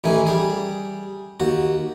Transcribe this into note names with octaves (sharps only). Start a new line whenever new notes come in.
A1 D#3 E3 G#5
G3 G#4
D#2 F#4